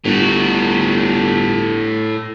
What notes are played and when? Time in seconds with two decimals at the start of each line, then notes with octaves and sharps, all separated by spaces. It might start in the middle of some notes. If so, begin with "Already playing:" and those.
0.05 G1 A2 F#4